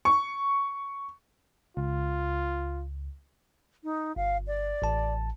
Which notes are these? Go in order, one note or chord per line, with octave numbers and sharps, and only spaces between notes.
C#6
C#2 F4
D#4
G1 F5
D5
A1 A5